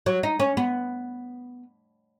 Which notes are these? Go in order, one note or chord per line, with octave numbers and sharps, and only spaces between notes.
F#3
D#4
C#4
B3